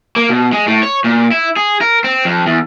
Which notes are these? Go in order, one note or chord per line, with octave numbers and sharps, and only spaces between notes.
A#3
B2
G#3
A2
C#5
A#2
E4
G#4
A#4
C4
F2
E2